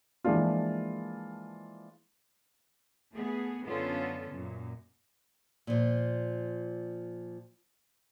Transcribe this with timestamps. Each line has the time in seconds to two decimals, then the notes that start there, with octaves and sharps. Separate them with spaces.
0.24 E3 F3 G#3 A#3 D4 F4
3.12 A3 B3 G#4
3.63 F#2 D3 B3 C#4 F4 A4
4.30 F#2 A#2
5.67 A#2 F3